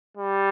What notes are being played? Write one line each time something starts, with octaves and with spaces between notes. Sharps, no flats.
G3